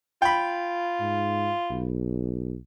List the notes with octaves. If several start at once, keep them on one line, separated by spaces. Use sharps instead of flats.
F4 G5 B5
G#2
B1